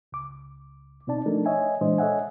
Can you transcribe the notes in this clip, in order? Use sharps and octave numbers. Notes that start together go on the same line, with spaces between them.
C#2 D6
B2 C4 D#4 D5 A5
F3 A3 D4 D#4 A4 A#4
C#5 D#5 E5 G#5
A#2 E3 G#3 D4 C5 D#5
A4 C#5 D#5 E5 F#5 G#5